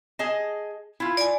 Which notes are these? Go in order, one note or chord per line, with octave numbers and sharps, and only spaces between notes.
G#4 D#5 A5
E4 F4
D5 G#5